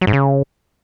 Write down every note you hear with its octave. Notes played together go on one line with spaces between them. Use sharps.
F#3
G#2
C#3